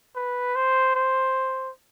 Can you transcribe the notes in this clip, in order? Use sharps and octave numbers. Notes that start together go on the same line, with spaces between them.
B4
C5
C5